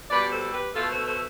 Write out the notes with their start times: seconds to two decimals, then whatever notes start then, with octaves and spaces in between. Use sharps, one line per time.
0.10 B2 G3 B4 D5
0.32 A4 C5
0.53 G4 B4
0.74 B2 A3 F4 A4
0.91 A4 C5
1.07 A4 C5